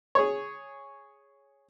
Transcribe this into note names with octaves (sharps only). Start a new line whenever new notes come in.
G#4 C#5